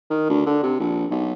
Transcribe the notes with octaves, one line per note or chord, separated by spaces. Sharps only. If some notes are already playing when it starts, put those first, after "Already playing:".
D#3
D2
D3
C3
A#1
B1